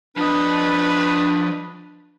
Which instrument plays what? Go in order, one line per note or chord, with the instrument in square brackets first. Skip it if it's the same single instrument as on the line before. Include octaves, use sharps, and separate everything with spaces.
[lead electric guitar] F3 D#5 [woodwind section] D4 [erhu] B4